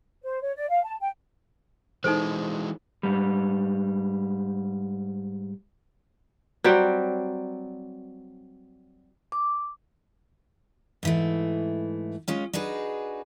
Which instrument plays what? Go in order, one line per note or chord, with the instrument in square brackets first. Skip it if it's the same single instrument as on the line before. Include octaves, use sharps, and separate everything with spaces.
[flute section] C5
C#5
D5
F5
A5
G5
[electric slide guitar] E3 G#3 [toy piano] D#4 A4 C5
[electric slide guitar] G#2 G3
[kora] F#3 G3 C4
[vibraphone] D6
[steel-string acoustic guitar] G#2 E3 A3
G#3 C#4 F4
D4 D#4 F#4 G#4 B4